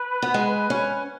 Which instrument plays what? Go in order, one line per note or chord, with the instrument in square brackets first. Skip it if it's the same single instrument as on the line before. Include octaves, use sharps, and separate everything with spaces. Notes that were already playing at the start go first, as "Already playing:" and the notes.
Already playing: [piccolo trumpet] B4
[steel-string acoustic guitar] B3
G#3
C#4